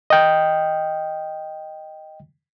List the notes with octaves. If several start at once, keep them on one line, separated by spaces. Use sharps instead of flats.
D#5 G5